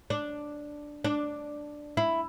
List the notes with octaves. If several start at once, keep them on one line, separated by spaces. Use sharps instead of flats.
D4
D4
E4